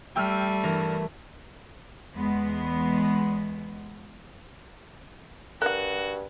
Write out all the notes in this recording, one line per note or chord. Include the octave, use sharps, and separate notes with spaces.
G3 A3 G5 E6 F6
G2 E3 A#4 G#6
E2 G#3 B3
G2 F#4 A#4 F#5 F#6